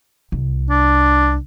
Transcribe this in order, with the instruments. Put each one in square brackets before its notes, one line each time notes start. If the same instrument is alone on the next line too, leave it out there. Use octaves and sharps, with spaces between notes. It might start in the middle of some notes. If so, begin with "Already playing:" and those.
[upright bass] C2
[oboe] D4